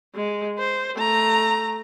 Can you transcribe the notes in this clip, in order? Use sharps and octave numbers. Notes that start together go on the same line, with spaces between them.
G#3
C5
A3 A#5